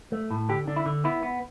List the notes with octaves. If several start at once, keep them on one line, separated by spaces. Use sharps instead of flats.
A3
A2
D3 G4
D3 D4
E4
D3
B3 E4
B3